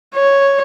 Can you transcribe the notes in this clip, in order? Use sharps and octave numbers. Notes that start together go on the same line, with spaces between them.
C#5